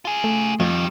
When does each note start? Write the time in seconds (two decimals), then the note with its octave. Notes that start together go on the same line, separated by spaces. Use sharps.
0.05 F4 G#4
0.24 A3
0.60 F2 D#3 G3